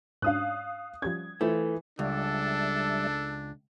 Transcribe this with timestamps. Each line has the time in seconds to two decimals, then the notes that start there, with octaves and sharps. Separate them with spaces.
0.22 G#2 C#4 D4 F5 D#6 F#6
1.02 F3 G3 C#4 G#6
1.41 E3 A3 F4 C5
1.99 C#2 G3 D4 A4 D5 E5